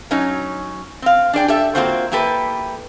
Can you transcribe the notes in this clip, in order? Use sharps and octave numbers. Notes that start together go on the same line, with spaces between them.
F#3 C#4 D#4
C4 F5
D4 G#4 D5 G5
G4 A4 E5
A#3 C4 F4 F#4 C5
A#3 E4 G4 A4 B4